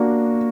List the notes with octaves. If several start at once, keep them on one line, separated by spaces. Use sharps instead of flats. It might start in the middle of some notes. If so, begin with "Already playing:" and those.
Already playing: A#3 D4 F#4